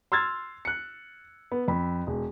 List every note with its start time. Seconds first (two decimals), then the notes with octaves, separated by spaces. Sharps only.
0.12 C6 E6 F6 G#6 A6
0.65 F#6 C#7
1.52 B3
1.68 F2 B5
2.07 E1